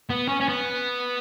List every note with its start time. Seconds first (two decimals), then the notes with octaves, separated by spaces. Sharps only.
0.10 B3
0.29 C#4
0.41 C#4
0.49 B3